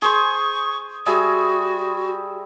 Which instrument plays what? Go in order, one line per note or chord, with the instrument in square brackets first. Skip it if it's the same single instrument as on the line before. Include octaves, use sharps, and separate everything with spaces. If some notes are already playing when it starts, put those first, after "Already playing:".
[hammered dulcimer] G#4 C5 [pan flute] C#6
[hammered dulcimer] G3 G#4 E5 [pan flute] F#4